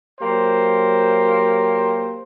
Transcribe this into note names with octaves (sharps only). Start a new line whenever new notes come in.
F#3 A#3 G4 C5